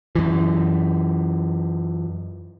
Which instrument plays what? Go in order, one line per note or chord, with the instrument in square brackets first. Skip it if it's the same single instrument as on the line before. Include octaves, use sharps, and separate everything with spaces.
[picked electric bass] F#2 E3